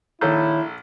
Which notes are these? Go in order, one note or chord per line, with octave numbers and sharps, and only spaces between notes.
A#1 D#3 E4 A4 C#5 G6